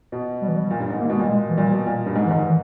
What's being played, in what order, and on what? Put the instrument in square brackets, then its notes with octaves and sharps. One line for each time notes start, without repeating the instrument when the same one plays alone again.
[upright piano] B2
[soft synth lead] G3
E3
G3
[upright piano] A#2
G2
G#2
[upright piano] D#3 [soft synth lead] A#3
[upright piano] B2 [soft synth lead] G#3
[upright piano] A#2 [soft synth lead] G3
[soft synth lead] G#3
E3
[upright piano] A#2 [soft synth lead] G3
[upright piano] B2
A#2
G2
[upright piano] G#2 [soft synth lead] G#3
[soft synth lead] E3
[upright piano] G#2 [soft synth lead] D#3
[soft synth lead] E3